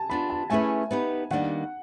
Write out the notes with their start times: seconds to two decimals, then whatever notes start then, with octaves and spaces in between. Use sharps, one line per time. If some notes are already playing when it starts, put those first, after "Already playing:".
Already playing: G#5 A5
0.10 B3 D4 F4 B5
0.30 A5
0.50 A3 C#4 E4 G#4 B4 G#5
0.91 B3 D#4 G4 B4
1.31 D#3 G3 A#3 D4 F#5